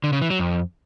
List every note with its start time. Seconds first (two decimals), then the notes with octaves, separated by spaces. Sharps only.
0.04 D3
0.13 C#3
0.22 E3
0.30 F#3
0.39 F2